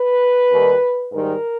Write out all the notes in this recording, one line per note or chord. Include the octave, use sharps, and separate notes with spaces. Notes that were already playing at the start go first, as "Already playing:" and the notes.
Already playing: B4
D#2 D#3 G3
G#2 D#3 G3 A#4